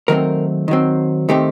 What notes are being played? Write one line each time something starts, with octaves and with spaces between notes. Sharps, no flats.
D#3 F#3 A3 C4 A#4
D#3 F#3 C4
D#3 A3 C4 G4